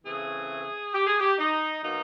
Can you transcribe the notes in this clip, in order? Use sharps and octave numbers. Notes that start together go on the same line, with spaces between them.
C#3 E3 A3 C4 G#4
G4
G#4
G4
D#4
B2 F#3 A#3 D#4